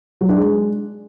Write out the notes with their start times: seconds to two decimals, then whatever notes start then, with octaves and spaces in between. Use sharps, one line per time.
0.21 F#3
0.29 D4
0.37 G#3